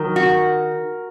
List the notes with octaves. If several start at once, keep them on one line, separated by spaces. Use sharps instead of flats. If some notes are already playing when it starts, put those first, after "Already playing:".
Already playing: D#3 F#3 A#4
F#4